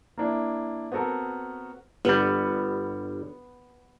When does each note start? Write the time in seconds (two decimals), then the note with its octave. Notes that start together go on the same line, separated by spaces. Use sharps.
0.17 A#3 D4 E4
0.92 B3 C4 F#4 A4 A#4
2.05 G1 G3 B3